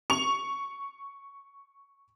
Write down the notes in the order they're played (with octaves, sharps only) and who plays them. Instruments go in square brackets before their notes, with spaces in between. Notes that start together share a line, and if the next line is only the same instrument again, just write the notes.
[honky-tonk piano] C#6 F7